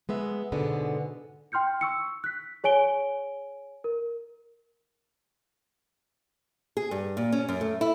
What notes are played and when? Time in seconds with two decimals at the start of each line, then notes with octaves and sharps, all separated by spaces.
0.09 G#3 B3 E5
0.52 G#2 B2 D3 G#3 B3
1.52 G5 C6 F6 G6 C#7
1.81 C#6 E6 C#7
2.24 F#6 B6
2.64 G#4 C#5 G#5 D7 G7
3.84 A#4
6.77 G#4
6.91 G2
7.17 A#2
7.32 C#4
7.49 F#2
7.61 A3
7.81 E4